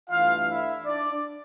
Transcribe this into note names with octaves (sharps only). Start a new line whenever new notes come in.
G2 E3 A3 D4 F4 F5
E4 E5
D4 D5